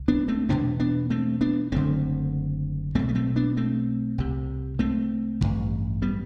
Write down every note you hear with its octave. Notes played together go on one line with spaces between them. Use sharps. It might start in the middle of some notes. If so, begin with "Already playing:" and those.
Already playing: C2
B3 D4
A3 C4
E1 E2 B2 B3 D4
B3 D4
A3 C4
B3 D4
F#1 F#2 D3 A3 C4
B1 B2 A3 C4
B3
A3 C4
B3 D4
A3 C4
C2 C3
A3 C4
A1 G2 D3
G3 B3